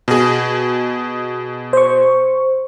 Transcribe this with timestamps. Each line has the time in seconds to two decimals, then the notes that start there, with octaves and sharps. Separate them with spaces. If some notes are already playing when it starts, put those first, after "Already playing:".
0.08 B2 G#4
1.73 C5 C#6